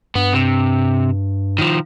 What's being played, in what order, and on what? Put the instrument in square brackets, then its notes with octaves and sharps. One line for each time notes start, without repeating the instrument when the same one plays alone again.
[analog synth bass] G2 [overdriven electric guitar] B3
[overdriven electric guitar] C3
D#3 F3